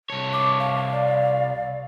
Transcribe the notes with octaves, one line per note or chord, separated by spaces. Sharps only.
C2 C#5 A5
D6
F5
D5